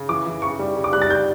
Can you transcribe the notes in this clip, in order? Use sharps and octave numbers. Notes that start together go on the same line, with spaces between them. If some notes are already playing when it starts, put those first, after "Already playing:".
Already playing: C#3
E3 D6
E3
C#3 C#6
G3
C#3
D6
G3 F#6
A6
G3 G6